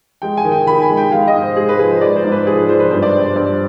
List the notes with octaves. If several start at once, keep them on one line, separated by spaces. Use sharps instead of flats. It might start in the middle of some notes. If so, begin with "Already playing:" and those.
G#3 G5
G#5
D#3
G5
D#3 B5
G#5
G#3
G5
G#3 F5
D#5
G#2
C5
G#3 G#4
B4
F3 G#4
C5
G#3 D5
C5
G#2
B4
F3 G#4
B4
F3 C5
B4
G2 C5
D5
G2 C5
C5
G2 D5